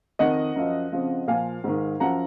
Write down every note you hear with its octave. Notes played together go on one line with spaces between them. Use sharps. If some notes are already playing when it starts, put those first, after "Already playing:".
F2 D#3 D#5 F#5
F#2 F3
F2 C#3 F3
A#2 F3 F5 G#5
G#2 D#3
F#2 F3 F#5 A#5